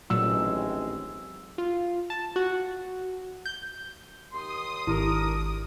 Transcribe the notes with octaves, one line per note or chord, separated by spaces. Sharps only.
A1 A#2 D#3 F#3 G#3 C4 E6
F4
A5
F#4
G6
D#2 C6 D#6
G#1 D4 E4 G4 A4 A#4